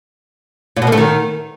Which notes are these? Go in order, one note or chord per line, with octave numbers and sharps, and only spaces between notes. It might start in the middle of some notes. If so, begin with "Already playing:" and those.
A#2
B2
A#3
A3
D#3